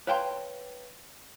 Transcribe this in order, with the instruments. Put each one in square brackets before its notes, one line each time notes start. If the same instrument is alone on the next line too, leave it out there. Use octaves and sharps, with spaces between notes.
[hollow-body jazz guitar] B4 C#5 F5 G5 A5 C6